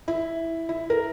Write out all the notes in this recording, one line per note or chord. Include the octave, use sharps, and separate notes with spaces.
E4
E4
A#4